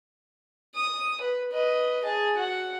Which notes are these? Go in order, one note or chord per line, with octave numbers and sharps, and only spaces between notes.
D#6
B4
B4 D#5
G#4 A5
F#4 F#5